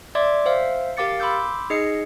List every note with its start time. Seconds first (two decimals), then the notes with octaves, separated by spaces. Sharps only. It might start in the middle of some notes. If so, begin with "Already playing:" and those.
0.15 D5 E5 C6 D6 G#6
0.46 C5 E5 F5
0.97 G4 A#4 F5 D6 A6 C#7
1.20 B5 C6 D6 E6 G6
1.70 D#4 G#4 D#5 C7 C#7